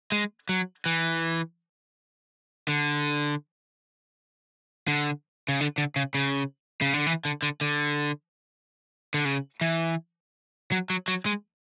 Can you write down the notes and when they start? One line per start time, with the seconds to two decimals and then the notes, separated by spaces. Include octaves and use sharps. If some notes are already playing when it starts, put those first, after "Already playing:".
0.12 G#3
0.49 F#3
0.86 E3
2.68 D3
4.88 D3
5.48 C#3
5.61 D3
5.78 D3
5.96 C#3
6.15 C#3
6.82 C#3
6.94 D3
7.07 E3
7.25 D3
7.42 D3
7.61 D3
9.14 D3
9.25 C#3
9.61 E3
10.72 F#3
10.90 F#3
11.08 F#3
11.26 G#3